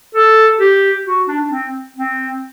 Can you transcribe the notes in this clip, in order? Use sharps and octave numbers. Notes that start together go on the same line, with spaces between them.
A4
G4
F#4
D4
D4
C4
C4